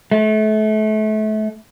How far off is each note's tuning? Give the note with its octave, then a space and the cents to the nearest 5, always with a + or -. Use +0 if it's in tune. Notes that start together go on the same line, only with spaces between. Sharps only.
A3 -30